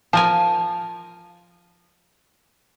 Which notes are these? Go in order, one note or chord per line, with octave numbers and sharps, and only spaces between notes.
F3 A#4 G#5 A5